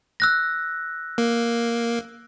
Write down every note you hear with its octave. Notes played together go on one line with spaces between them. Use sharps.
E6 F#6 A#6
A#3